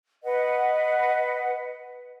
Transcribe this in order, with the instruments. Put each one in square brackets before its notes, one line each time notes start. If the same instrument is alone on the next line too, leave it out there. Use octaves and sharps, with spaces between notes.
[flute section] B4 D#5 F#5